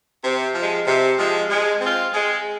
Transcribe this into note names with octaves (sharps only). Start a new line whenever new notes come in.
C3
F3 G#3
C3
F3 G#3
G#3
C4 F4
G#3